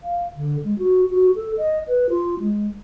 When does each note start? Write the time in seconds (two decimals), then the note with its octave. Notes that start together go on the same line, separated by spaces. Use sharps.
0.03 F5
0.36 D3
0.65 G#3
0.79 F#4
1.10 F#4
1.36 A4
1.58 D#5
1.87 B4
2.10 F4
2.40 G#3